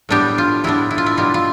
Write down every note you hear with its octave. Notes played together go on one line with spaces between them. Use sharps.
A2 G3 B3 D4 G4
F4
A2 G3 B3 D4 E4
E4
F4
E4
B2 G3 B3 D4 F4
F4